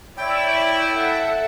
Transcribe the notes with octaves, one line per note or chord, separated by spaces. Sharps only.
E4 C#5 D5 G5
A4 E5 F#5